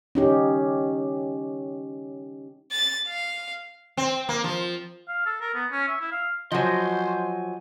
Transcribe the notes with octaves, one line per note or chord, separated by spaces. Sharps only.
C#4 D#4 G4
A6
F5
C4
A#3
F3
F5
A4
A#4
B3
C#4
E5
E4
F5
F3 F#3 C5 D#5 F#5 G#5